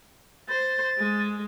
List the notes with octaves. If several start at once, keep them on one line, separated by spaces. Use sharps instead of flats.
C5 A6
G#3